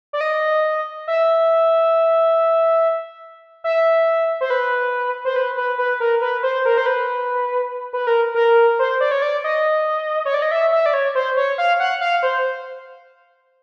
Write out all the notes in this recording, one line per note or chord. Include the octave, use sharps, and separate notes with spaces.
D5
D#5
E5
E5
C5
B4
C5
B4
B4
B4
A#4
B4
C5
A#4
C5
B4
B4
A#4
A#4
C5
D5
C#5
D5
D#5
C#5
D5
D#5
E5
E5
D5
C#5
C5
C#5
F5
F#5
F5
C5